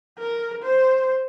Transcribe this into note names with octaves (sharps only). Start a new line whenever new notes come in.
A#4
C5